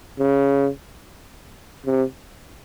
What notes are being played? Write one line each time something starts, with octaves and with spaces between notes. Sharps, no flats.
C#3
C3